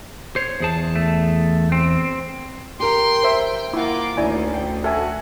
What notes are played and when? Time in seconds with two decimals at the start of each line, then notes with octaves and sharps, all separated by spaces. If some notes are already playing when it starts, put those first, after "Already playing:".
0.36 C5 C#5
0.60 E2 G#4 A5
0.96 A3
1.72 C4
2.80 G4 A#4 G5 C6
3.23 C5 E5
3.73 A#3 E4 F4 F#5 D6
4.17 D2 D#3 C#4 E4 D5 G#5
4.54 G5
4.84 F#4 A4 E5 G#5